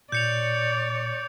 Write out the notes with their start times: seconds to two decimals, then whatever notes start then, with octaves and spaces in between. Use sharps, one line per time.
0.12 A#2 C#5 D5 G6 C#7 F7